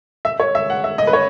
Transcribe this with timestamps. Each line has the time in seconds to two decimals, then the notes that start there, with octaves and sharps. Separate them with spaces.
0.25 E5
0.40 C#5
0.55 E5
0.70 F#5
0.84 E5
0.98 D#5
1.07 B4
1.13 C#5